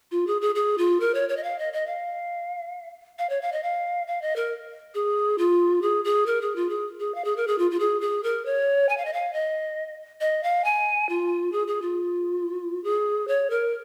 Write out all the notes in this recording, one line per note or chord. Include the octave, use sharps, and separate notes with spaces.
F4
G#4
G#4
G#4
F4
A#4
C#5
C#5
D#5
F5
D#5
D#5
F5
F5
C#5
F5
D#5
F5
F5
D#5
A#4
G#4
F4
G#4
G#4
A#4
G#4
F4
G#4
G#4
F5
G#4
A#4
G#4
F4
F4
G#4
G#4
A#4
C#5
G#5
F5
D#5
F5
D#5
D#5
F5
G#5
F4
G#4
G#4
F4
G#4
C#5
A#4